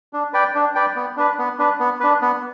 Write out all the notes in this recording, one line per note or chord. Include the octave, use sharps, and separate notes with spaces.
D4
B4 D5 G5
D4
B4 D5 G5
B3
D4 B4
B3
D4 B4
B3
D4 B4
B3